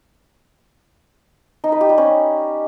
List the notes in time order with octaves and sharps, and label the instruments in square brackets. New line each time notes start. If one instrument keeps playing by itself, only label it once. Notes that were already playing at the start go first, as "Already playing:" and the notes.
[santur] D#4
B4
G4
G3
C#4